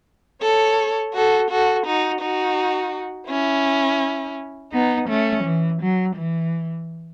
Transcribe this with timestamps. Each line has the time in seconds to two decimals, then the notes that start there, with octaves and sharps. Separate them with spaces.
0.42 A4 C#5
1.15 F#4 A4
1.50 F#4 A4
1.86 D#4 F#4
2.21 D#4 F#4
3.29 C#4 E4
4.73 B3 D#4
5.09 A3 C#4
5.45 E3
5.82 F#3
6.16 E3